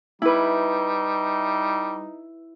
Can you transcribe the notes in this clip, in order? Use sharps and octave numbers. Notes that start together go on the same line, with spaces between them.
G3 D#4 E4 B4